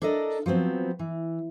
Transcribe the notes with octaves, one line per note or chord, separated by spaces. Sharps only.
D4 A4 A#4 D5 D#5
F3 F#3 B3 C4
E3